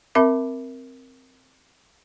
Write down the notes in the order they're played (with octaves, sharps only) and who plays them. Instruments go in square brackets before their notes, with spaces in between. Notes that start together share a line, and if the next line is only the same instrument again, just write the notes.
[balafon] C4 A#4 E5 B5 D6